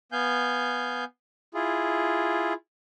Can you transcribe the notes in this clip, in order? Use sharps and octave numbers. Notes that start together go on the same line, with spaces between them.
B3 F5 G#5 G6
E4 F4 G#4